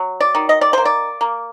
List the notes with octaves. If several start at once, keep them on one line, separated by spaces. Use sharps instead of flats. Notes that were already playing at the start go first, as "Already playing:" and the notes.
Already playing: F#3
D5
D#3
D#5
D5
A#3 C5
D5
A#3